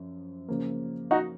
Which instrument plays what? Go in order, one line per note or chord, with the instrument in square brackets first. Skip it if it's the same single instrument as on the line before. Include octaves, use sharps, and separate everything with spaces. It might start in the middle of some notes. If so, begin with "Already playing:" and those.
Already playing: [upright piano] F#2 F3
C#3 F3 A#3
[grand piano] D#4 F#4